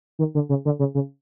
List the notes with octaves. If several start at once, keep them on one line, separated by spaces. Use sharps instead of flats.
D#3
D3
C#3
D3
C#3
C#3